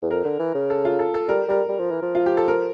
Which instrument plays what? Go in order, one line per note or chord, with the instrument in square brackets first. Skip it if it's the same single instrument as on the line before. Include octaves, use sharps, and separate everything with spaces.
[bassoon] E2
[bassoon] F2 [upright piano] A#4
[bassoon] D3
E3
C#3
[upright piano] A4
F4
A4
A4
[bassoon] G3 [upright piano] A#4
[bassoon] G3 [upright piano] A#4
[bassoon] G3
F3
E3
F3
[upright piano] F4
G4
A4
A#4